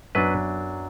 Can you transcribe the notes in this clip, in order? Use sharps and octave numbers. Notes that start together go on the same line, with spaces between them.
F#2 F#3 B3 D4 B4